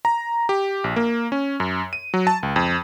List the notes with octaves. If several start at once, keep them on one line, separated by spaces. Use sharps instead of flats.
A#5
G4
A#1
A#3
C#4
F#2
D#7
F#3
A5
C#2
F2